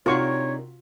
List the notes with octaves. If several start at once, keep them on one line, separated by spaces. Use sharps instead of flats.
C3 D4 D#4 F4 F#4 A#4 C#5 C#6